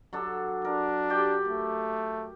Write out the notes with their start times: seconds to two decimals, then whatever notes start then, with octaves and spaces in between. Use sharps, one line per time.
0.13 F#3 D4 A4
0.65 D4 A#4
1.10 G4 D5 G5
1.48 A3